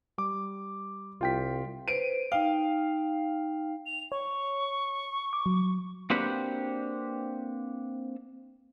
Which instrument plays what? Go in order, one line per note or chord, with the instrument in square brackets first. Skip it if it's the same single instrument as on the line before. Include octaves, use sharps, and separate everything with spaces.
[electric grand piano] G3 D6
[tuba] C2 [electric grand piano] F4 G5 B6
[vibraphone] B4 C5 [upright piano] D7 D#7
[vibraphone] D#4 G5 [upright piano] F5
[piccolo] F7
[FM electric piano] C#5 [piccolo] C#6
[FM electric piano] D6
F#3
[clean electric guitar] A#3 C4 D4 F#4 G4 B4